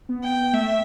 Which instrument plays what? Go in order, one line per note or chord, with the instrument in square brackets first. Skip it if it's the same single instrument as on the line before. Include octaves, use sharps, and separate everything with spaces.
[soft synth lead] B3
[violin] G5
[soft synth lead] B3
[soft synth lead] A3 [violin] E5